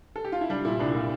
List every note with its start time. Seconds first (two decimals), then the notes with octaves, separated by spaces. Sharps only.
0.16 A4
0.24 G4
0.32 F4
0.41 E4
0.50 G3 D4
0.65 A#2 E4
0.79 C2 D4
0.94 A#2